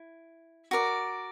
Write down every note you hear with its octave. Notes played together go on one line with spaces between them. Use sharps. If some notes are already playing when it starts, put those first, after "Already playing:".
Already playing: E4
F#4 A#4 D5